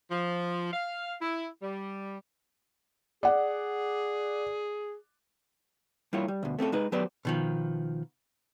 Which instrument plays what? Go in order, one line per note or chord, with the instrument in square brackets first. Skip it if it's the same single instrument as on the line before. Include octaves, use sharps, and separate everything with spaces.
[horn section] F3
F5
E4
G3
[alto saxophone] G#4 [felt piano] D5 F#5
[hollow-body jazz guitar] G3 A#3 E4 F4 C#5
G3
D2 B2
A3 C4 C#4 A4
G#3 D#4 B4
F#3 B3 G4 B4 C5 D5
B2 D#3 F3